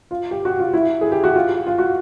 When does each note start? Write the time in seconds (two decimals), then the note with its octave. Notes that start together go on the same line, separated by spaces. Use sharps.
0.11 F4
0.31 G4
0.45 F#4
0.59 F4
0.74 E4
1.01 G#4
1.12 G4
1.24 F#4
1.36 F4
1.67 F4
1.78 F#4